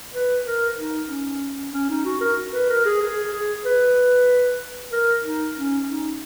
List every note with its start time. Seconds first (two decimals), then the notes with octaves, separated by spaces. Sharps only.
0.14 B4
0.45 A#4
0.78 D#4
1.09 C#4
1.73 C#4
1.90 D#4
2.05 F#4
2.21 A#4
2.53 B4
2.69 A#4
2.86 G#4
3.01 G#4
3.32 G#4
3.65 B4
4.92 A#4
5.24 D#4
5.56 C#4
5.87 D#4